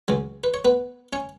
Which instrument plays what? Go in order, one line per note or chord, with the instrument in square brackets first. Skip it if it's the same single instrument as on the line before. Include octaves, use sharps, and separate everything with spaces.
[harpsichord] C#2 C#3 F#3
B4
C#5
B3 B4
C#4 C#5